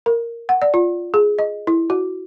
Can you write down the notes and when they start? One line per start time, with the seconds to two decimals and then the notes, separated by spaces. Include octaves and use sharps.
0.06 A#4
0.49 F#5
0.62 D5
0.74 F4
1.14 G#4
1.39 D#5
1.67 E4
1.90 F#4